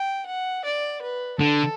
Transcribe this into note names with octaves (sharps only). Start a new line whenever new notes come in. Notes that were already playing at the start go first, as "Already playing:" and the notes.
Already playing: G5
F#5
D5
B4
D3 A4